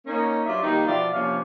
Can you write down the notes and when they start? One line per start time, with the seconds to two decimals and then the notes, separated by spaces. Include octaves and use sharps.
0.06 A#3 C#4 D#4
0.46 G2 F#3 D4 F4 D5 E5
0.63 D#3 G3 A#3 D#4
0.86 B2 F3 F4 D5 E5
1.13 C3 F3 A#3 C#4 D4 F5